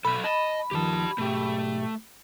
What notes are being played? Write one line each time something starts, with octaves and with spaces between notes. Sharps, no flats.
B1 F#3 A4 B5
D#5 A5
D#2 D#3 F3 G4 A5
B1 G#2 A3 G4